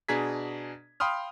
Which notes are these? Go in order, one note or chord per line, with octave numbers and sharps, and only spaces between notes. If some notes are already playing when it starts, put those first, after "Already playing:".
B2 D4 G#4 A#5 G#6 B6
F5 G5 B5 C6 D#6 F6